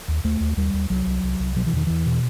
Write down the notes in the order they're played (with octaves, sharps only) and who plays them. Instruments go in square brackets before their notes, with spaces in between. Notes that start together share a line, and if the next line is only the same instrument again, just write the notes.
[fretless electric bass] D#2
D#2 A3
D#2
D#2 G3
D#2
C2 F#3
C2
C2
C2
B2 F#3
E3
E2 D#3
E2 E3
B2